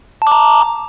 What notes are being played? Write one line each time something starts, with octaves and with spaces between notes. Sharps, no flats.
A5 A#5 D6